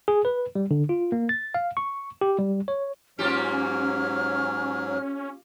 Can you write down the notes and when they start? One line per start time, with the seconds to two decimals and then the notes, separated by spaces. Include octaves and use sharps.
0.08 G#4
0.25 B4
0.55 G3
0.71 D3
0.89 F4
1.12 A#3
1.29 A6
1.54 F5
1.77 C#6
2.21 G4
2.38 G3
2.68 C#5
3.19 G#2 F#3 A#3 C#4 F4 G4 F6